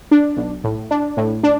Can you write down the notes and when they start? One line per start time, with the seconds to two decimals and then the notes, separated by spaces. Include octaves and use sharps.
0.11 D4
0.37 B1
0.64 A2
0.91 D4
1.17 A2
1.43 D4